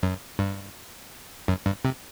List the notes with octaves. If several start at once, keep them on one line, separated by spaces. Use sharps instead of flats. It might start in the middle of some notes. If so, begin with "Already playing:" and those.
F#2
G2
F#2
G2
C3